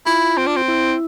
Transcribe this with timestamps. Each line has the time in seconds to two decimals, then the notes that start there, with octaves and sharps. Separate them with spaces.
0.06 E4 F4
0.37 C4
0.47 D4
0.56 C4
0.68 E4